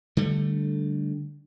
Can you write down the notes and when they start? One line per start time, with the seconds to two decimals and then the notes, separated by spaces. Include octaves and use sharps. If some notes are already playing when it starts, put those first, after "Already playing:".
0.17 D3 G3 A3